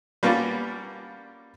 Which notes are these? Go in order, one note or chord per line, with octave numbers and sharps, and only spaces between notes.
G3 A#3 B3 C#4 D4 F4